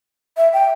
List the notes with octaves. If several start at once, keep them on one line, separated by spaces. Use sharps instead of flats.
E5
G5